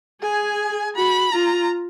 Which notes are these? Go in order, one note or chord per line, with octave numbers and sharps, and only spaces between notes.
G#4 G#5
F#4 B5
F4 A#5